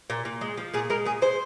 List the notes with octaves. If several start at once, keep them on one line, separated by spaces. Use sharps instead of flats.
A#2
A#2
G#3
F3
A#2 G#4
G#3 A#4
A#2 G#4
G#3 C5